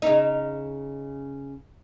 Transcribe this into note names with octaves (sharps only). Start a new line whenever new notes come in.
C#3 D#4